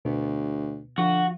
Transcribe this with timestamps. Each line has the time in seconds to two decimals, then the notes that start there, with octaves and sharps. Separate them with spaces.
0.05 D2 B2
0.98 D3 F3 F#4